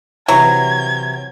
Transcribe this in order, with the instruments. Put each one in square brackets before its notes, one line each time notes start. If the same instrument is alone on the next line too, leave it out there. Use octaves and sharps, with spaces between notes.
[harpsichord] C3 E3 A#5 [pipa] F#3 [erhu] G#6